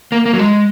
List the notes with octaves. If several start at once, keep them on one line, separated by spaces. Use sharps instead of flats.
A#3
A#3
F#3
G#3